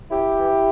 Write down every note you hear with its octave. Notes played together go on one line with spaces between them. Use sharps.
F#2 E4 G4
E3